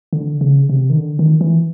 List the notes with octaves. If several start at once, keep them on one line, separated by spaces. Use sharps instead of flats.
D3
C#3
C3
D#3
D3
D#3
E3